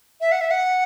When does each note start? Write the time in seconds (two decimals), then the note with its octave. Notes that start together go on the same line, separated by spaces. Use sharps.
0.21 E5
0.32 F#5
0.41 E5
0.51 F#5